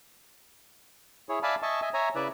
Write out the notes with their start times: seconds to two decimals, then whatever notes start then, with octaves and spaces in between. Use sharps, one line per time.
1.29 E4 G#4 C#5
1.43 D5 E5 F5 G#5 A5 B5
1.62 D#5 E5 G#5 A5 C#6
1.82 D#5 E5 G#5
1.94 C#5 E5 G#5 A#5
2.15 C#3 E4 B4 D5 E5